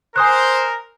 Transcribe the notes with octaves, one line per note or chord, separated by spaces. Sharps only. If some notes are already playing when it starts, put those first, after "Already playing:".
A#4 C5 G#5 D#6 F#6